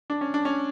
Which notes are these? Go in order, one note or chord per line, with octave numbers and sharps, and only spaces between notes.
D4
C#4
D4
C#4